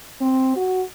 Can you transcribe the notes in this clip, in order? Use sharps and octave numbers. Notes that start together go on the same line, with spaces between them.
C4
F#4